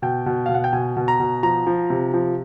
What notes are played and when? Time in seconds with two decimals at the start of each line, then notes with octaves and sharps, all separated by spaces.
0.02 B2 G5
0.26 B2
0.46 B2 F5
0.54 F#5
0.64 G5
0.73 B2 G#5
0.96 B2
1.08 A#5
1.20 B2
1.43 F3 A#5
1.67 F3
1.90 C3
2.14 F3